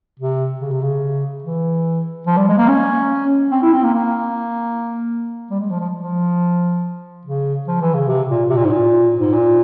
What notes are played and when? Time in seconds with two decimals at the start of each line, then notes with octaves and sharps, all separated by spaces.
0.19 C3
0.61 C#3
0.71 C3
0.82 C#3
1.44 E3
2.27 F3
2.37 G3
2.48 G#3
2.58 A#3
2.68 C#4
3.51 C4
3.62 E4
3.73 C4
3.83 A#3
3.93 A#3
5.51 G3
5.60 G#3
5.70 F3
5.80 F3
6.01 F3
7.26 C#3
7.67 F3
7.81 E3
7.94 C#3
8.08 C3
8.29 A#2
8.49 C3
8.57 A#2
8.65 G#2
8.71 A#2
9.19 G#2
9.33 A#2